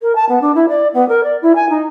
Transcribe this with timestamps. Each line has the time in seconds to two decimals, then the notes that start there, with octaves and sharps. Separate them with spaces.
0.01 A#4
0.15 A5
0.29 B3
0.41 D4
0.55 E4
0.69 D5
0.93 B3
1.08 A#4
1.23 D5
1.42 E4
1.55 G#5
1.69 D#4